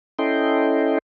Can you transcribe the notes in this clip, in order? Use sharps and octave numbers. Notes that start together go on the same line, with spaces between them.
C#4 E4 A4 D#5 G5 C6